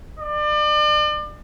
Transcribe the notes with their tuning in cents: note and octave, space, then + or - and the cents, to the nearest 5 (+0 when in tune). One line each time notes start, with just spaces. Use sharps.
D5 +35